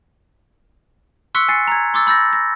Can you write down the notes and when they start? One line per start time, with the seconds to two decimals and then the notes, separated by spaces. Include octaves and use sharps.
1.35 C6 C#6 E6 F#6 B6 C#7
1.48 G#5 A6 C7 C#7
1.68 A#5 G#6
1.94 C6 D6 E6 A6
2.07 B5 E6 G6 A6 A#6
2.33 A#6